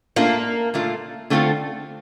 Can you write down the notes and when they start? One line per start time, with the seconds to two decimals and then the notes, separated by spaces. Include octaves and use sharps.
0.16 A#2 A3 A#3 D4 F4
0.74 A#2 A3 D4 F4
1.30 D3 A3 C4 F4 A4